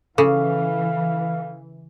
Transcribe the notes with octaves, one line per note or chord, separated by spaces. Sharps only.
C#3 E3 A4 F5